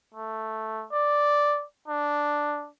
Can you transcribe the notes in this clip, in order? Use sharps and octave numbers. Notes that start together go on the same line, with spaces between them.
A3
D5
D4